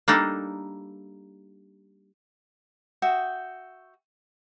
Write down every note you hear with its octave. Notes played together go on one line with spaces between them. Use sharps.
G3 A#3 D4 D#4 A4
F#4 E5 G5 D#6